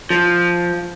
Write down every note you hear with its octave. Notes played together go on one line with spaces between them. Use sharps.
F3